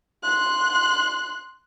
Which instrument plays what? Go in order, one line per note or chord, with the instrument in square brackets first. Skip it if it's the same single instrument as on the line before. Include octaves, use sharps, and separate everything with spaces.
[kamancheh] C6 F#6